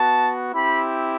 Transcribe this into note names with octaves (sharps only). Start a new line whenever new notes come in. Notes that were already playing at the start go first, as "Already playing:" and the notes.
Already playing: B3 F#4 A5
C4 E4 G4 B5